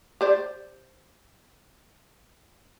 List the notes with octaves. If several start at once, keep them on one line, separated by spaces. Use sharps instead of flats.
G4 C5 D5